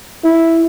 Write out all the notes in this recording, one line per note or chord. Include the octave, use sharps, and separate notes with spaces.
E4